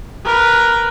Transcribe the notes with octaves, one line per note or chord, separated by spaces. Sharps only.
A#4 B4